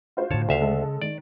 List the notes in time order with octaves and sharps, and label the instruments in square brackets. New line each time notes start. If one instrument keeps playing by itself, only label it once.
[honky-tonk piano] F4 F#4 C5
[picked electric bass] A2 D3 [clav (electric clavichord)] C#5 A5
[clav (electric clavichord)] D2 E5 F5 [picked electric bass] C#3
[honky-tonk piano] G#3 A4
[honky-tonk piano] D#3 [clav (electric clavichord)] D5